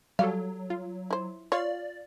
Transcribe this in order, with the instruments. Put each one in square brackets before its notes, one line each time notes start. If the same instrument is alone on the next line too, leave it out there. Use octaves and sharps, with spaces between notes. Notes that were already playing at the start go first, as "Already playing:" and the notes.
[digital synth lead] F#3 [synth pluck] G3 F#4 A4 [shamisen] F5
[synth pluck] F4
[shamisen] E4 C5
[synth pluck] F4 F5 [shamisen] C#5 [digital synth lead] D5